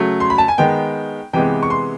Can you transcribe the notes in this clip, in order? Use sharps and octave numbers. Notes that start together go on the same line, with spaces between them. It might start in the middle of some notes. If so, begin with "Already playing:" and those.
Already playing: C#3 F#3 A3
C6
B5
A5
G#5
D#3 G#3 B3 G5
C3 E3 G#3 B3 G5
C#6
C6